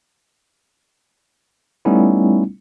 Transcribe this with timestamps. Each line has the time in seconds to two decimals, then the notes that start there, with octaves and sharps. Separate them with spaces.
1.85 G3 A3 B3 C#4 D#4 E4